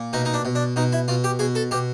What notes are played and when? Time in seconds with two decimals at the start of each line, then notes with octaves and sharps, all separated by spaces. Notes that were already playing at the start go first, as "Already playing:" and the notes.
Already playing: A#2
0.13 B2 D#4
0.25 D#4
0.34 D4
0.45 B2
0.55 D4
0.76 B2 D#4
0.92 E4
1.08 B2 F4
1.24 G4
1.39 B2 G#4
1.55 A4
1.71 B2 G4